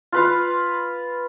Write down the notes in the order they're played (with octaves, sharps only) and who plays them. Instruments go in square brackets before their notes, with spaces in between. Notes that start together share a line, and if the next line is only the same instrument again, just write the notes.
[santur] F4 B4 F5